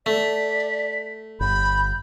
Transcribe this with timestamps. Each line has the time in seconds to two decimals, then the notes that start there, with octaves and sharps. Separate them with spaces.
0.06 A3 D5 B6
1.40 G1 B5 G6